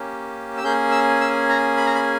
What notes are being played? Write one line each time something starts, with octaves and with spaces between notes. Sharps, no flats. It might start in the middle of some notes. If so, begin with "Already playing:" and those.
Already playing: A#3 C#4 G4
E6
A#3 C#4 G#4 G6
E6
E6
A#5
B5
A#5
B5